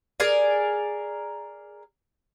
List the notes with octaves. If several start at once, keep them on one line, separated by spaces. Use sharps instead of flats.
G#4 A#4 D5